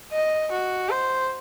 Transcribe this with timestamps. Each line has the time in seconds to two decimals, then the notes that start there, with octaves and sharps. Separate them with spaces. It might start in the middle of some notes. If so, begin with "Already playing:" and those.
0.12 D#5
0.51 F#4
0.90 C5